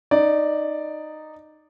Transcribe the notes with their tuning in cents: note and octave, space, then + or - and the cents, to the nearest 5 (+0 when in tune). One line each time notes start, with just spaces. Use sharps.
D#4 -10 D5 +0